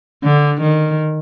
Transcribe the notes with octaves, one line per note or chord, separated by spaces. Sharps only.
D3
D#3